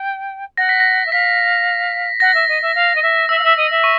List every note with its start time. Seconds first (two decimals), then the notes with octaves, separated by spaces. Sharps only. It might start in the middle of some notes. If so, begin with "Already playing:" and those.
Already playing: G5
0.57 F#5 A#6
0.69 B6
0.80 A#6
1.06 E5
1.12 F5 B6
2.20 F#5 A#6
2.34 E5
2.48 D#5
2.61 E5
2.75 F5
2.95 D#5
3.02 E5
3.29 E5 E6
3.39 F5
3.43 E5
3.57 D#5
3.70 E5
3.84 C#6